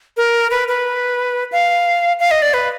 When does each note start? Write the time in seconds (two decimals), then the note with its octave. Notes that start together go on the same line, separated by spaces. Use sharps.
0.17 A#4
0.51 B4
0.68 B4
1.52 F5
2.20 F5
2.31 D#5
2.42 D5
2.54 B4